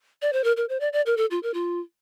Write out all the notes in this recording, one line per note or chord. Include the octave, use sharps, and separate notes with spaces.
D5
C5
A#4
A#4
C5
D5
D5
A#4
A4
F4
A#4
F4